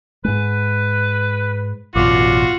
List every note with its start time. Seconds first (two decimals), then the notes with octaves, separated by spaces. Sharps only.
0.25 G#2 G#3 B4
1.95 A1 F#2 B2 F4 F#4 D5